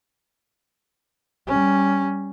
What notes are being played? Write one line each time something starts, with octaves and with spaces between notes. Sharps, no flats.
G3 C#4